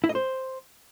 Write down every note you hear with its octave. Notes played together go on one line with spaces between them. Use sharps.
E4
D#5
C5